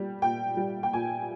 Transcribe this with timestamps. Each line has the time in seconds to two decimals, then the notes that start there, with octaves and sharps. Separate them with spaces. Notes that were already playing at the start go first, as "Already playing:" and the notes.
Already playing: A#2 G3
0.22 A#2 G5
0.57 G3
0.83 G5
0.93 A#2 G#5